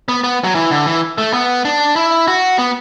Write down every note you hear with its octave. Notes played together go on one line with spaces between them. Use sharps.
B3
B3
F#3
E3
D3
E3
A3
B3
D4
E4
F#4
B3